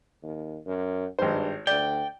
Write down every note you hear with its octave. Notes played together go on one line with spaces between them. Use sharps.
D#2
F#2
G#1 G2 C5
D2 D5 G5